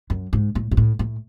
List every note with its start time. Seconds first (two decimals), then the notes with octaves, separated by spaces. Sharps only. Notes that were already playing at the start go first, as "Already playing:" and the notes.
0.10 F#2
0.33 G#2
0.55 A2
0.71 G#2
0.77 A2
0.99 A2